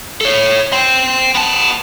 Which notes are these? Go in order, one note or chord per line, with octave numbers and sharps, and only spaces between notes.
A4 C#5
G5 C6
B3 A5